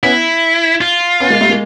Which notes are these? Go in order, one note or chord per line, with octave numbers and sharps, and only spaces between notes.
B3 C#4 E4
F4
B3 C#4
G#3 A#3
G3 A3
G#3 A#3